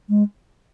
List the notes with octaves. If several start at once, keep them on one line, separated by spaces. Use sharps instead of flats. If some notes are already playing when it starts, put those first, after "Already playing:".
G#3